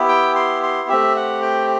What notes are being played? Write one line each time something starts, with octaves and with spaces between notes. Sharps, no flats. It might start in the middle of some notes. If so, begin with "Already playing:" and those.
Already playing: B3 E4 G4
G5
C6
C6
A3 C4 G4 E5
F#5
G5